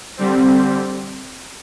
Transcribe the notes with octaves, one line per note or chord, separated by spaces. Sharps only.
D3 G3 C4